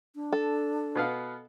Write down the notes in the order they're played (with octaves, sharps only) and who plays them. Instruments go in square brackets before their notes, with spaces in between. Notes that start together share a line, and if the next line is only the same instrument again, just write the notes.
[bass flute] D4
[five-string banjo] A4
[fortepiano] B2 B3 F5